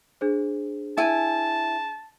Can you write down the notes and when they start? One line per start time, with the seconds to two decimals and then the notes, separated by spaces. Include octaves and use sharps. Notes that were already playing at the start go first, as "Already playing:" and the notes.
0.21 D4 G#4 C5
0.98 E4 G#5 A5